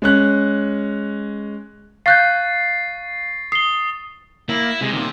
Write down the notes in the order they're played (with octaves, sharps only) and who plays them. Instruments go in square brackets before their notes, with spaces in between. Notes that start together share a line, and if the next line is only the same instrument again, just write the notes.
[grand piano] G#3 C#4 F#6
[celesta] F5 F#6 G6 [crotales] C#6 A6 C7
[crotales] D#6 G7 [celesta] C7
[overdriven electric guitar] A#3 [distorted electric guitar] E4
[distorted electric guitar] C3 [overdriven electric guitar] G#3
[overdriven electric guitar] A#2 D#3